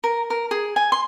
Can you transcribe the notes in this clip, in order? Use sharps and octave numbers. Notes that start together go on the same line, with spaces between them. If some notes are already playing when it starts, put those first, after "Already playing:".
A#4
A#4
G#4
G#5
C6